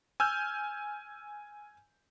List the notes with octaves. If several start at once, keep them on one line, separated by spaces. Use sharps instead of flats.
G#5 E6 F6 G6